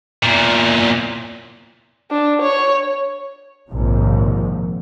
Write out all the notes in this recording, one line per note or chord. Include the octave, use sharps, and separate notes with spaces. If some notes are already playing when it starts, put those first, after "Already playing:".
E2 A#2
D4
C#5
A#1 D#2 G#2 C3 F3